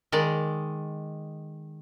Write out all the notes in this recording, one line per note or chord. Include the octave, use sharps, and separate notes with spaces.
D#3 G#3 D5